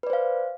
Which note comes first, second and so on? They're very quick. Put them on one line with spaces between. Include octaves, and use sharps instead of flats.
B4 D5 C5 F5